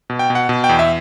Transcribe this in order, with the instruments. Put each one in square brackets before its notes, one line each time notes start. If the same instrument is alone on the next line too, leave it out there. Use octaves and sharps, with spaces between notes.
[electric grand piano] B2
G5
B2
F#5
B2
G5
E2
E5